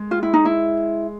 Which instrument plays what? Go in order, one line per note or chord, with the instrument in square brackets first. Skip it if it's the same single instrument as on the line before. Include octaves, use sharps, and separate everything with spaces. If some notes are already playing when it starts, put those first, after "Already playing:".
Already playing: [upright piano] G#3
[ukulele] F4
E4
D#4
E4